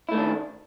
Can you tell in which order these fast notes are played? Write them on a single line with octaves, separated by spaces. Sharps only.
E4 A3 D#3 D4